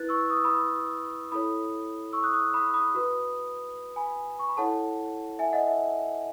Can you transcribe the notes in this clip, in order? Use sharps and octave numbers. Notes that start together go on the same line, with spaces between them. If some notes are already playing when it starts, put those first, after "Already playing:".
Already playing: E4 B4 F#6 A6
C#6 E6
D#6
E6
B5 D#6
E4 A4 C#5 B5 D#6
C#6 E6
D#6 F#6
D#6 F#6
B5 D#6
B5 D#6
F#4 B4
G#5 B5
C#6
B5
E4 A4 C#5 F#5 A5
E5 G#5
D#5 F#5
E5